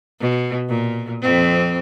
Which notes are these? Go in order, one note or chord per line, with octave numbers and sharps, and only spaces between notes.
B2
A#2
F2 C4